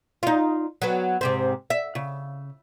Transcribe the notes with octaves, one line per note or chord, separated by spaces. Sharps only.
D#4 F4
F#3 B3
G#2 C3 C4
E5
C#3